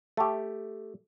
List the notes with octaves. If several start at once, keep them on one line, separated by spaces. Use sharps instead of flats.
A3 G4